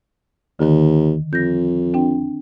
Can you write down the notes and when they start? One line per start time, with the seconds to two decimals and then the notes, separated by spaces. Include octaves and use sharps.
0.59 D#2 D3 D#3
1.33 F2 G6 A#6
1.94 C4 D4 G5